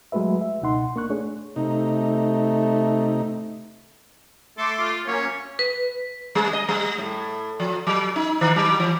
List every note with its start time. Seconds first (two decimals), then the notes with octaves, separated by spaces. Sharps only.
0.12 F#3 G#3 A3 F#4 B4 E5
0.41 E5
0.62 C#2 B2 D#4 F#5 C6
0.96 A#3 D4 C#6 F#6
1.10 A3 D4 G#4 C#5
1.56 C3 A3 D#4
4.58 A3 A4 C6 D6
4.79 F4
5.07 F#3 A#3 C#4 C#5
5.59 B4
6.35 G3
6.53 D#5
6.68 G3
6.98 A2
7.60 F3
7.87 F#3
8.16 D#4
8.41 D#3
8.56 F#3
8.80 E3